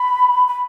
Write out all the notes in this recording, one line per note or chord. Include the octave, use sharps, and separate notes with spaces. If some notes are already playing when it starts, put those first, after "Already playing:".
Already playing: B5
B5